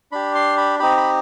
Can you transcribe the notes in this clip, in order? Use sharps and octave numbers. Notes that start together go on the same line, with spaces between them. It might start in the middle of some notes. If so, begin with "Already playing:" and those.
D4 G4 B5
C6
B5
C4 D#4 G4 B5
B5